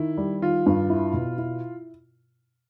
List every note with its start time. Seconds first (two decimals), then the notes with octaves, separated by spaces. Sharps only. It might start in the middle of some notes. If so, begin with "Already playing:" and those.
Already playing: D#3 E4
0.18 G3
0.42 D#3 F4
0.66 G2
0.90 E4
1.13 B2
1.38 E4